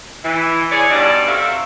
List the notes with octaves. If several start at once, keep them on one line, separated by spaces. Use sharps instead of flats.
E3
G#4 C#5 D5
G2 B2 G3 D4 D#4 D5
C3 F#4 A4 A#4 E5 F5